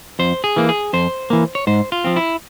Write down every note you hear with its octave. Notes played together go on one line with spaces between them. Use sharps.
F2 C5
G#4
E3 A#3
G#4
F2 C5
E3 A#3
C#5
G#2 C5
F4
F3 C4
E4